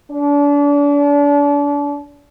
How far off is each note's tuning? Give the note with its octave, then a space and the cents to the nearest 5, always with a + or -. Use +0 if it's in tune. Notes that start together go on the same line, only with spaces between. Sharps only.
D4 -35